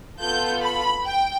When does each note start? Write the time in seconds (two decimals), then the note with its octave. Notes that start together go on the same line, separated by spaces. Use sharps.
0.18 B3 F4 A4 G6
0.62 B5
1.05 G5